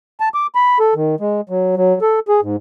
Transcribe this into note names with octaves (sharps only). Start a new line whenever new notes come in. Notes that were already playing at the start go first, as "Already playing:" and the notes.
A5
D6
B5
A4
D#3
G#3
F#3
F#3
A4
G#4
G#2